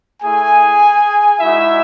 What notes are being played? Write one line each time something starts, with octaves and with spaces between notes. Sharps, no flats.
A3 E4 G#4 G#5
G#3 D#4 E4 F#4 E5